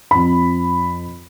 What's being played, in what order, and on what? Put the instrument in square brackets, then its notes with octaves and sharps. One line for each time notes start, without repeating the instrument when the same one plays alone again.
[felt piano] F2 B5